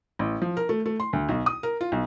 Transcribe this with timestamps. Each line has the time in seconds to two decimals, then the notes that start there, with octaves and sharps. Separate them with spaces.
0.19 A1
0.42 F3
0.57 A#4
0.69 A3
0.86 A3
1.00 C6
1.13 D2
1.29 B1
1.46 D#6
1.63 A#4
1.81 F4
1.92 B1